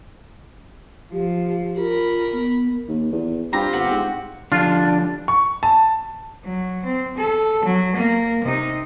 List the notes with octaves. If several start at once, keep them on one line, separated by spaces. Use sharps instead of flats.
F3 G4
F4 A#4 B5
B3
D#2
E2
G2 C4 F4 G4 A#5
G1 F#4
G#2
D3 F3 D4 F4 G4
C#6
A5
F#3
C4
A4
F#3
A#3 A#4
C3 D#4